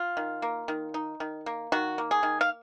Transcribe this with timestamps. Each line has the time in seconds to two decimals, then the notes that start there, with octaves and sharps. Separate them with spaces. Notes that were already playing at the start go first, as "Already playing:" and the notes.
Already playing: F4
0.17 D#3
0.42 A#3
0.68 D#3
0.94 D#4
1.20 D#3
1.46 A#3
1.72 D#3 F#4
1.98 A#3
2.11 G#4
2.23 D#3
2.41 F5